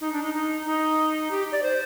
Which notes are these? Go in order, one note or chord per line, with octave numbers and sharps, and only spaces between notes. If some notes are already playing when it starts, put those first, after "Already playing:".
D#4
D4
D#4
D#4
D#4
G4
D5
C5